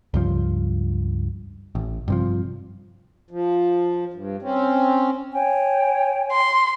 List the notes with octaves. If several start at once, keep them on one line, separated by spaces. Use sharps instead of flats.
C#2 G2 F3
A1
G2 C3 F3
F3
G2
C4 C#4
C#5 G5 G#5
C6